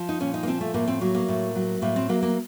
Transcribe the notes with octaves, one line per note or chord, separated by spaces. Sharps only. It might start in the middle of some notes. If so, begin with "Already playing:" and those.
Already playing: F3
D#4
A#2 C#4
D#4
A#3
F3 C4
A3
A2 A#3
C4
F#3 A#3
A#3
A2
F#3
A2 A#3
C4
F#3 A#3
A#3